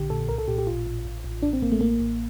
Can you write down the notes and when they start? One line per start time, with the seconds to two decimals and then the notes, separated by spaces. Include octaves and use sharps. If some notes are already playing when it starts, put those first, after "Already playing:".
Already playing: A#1 D3 G4
0.10 A#2 A4
0.29 C2 A#4
0.38 A4
0.48 A#2 G4
0.58 G4
0.67 A1 F4
0.87 A1
1.05 A1
1.24 A1
1.43 A1 D4
1.53 C4
1.62 A1 A#3
1.72 A3
1.81 A1 A#3
2.00 A1